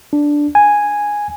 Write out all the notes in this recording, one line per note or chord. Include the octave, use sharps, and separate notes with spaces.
D4
G#5